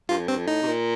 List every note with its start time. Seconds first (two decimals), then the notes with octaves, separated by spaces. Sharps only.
0.09 G2 F4
0.18 F2
0.28 G2 C4
0.38 F2
0.47 A2 D#4
0.62 C3
0.67 A#2